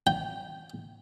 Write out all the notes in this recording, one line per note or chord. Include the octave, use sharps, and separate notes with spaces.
G5